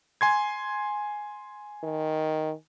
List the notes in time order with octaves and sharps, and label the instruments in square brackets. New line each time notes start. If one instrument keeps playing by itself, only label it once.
[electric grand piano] G#5 C6 G#6
[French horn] D#3